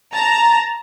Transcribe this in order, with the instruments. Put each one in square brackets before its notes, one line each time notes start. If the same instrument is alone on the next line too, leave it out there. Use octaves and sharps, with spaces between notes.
[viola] A5 [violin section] A#5